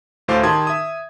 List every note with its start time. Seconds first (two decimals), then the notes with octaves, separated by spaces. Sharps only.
0.28 D2 A2 A4 C5 F5 D6
0.43 D#3 G4 A5 C6 D#6 G#6
0.67 E5 D#6